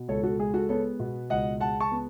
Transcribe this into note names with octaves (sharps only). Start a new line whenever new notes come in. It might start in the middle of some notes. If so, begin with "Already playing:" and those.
Already playing: B2
C#2 A4 C#5
F#4 A4
G#3 G#4
F#4 A4
B3 A4 C#5
B2
C#2 D#5 F#5
G#3 F#5 A5
A5 C#6
B3